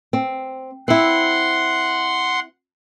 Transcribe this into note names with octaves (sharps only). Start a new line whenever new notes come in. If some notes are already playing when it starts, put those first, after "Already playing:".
C4
C4 E4 F#5 C6